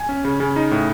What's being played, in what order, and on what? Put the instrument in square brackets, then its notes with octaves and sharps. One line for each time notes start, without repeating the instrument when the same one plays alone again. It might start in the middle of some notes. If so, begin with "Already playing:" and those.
Already playing: [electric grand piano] G#5
C#4
C#3
C#3
D#4
A2